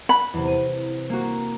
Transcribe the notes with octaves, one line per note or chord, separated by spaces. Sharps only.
B5 F#6
E2 C3
D#7
A#3 F#4